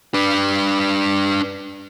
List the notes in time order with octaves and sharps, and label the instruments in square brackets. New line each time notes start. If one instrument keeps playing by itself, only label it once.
[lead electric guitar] D4 B4